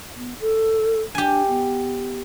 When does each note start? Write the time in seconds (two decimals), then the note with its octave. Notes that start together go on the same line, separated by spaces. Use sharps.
0.17 B3
0.40 A4
1.15 D4 G4 G#5
1.48 B3